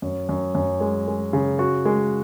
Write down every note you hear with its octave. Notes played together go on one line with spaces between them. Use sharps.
F#2
F#2
F#2
G#3
G#3
C#3
F#4
G#3